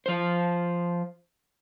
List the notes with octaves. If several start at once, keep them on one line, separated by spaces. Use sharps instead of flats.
F3 C5